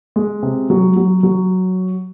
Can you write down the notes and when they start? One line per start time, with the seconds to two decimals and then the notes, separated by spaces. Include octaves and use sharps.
0.16 G#3
0.43 C3
0.70 F#3
0.96 F#3
1.23 F#3